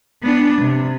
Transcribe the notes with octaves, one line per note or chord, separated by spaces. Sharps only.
B3 D4
C3